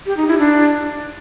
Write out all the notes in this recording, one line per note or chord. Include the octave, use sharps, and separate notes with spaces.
G4
D#4
E4
D4